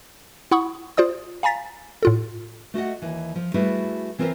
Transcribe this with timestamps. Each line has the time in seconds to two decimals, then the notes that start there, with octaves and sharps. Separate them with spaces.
0.51 E4 F#5 B5 C#6 D#6
0.97 F4 C5 D5 D#6
1.43 F5 G#5 A#5 A6 B6
2.03 A2 F4 A4
2.74 A3 F#4 D#5 F#5
3.02 D#2 E3
3.36 F3
3.54 G3 A3 E4 F#4 G#4 B4
4.19 E3 C4 F4 A#4 C5 E5